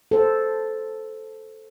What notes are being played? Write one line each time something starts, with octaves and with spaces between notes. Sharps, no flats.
A4 C5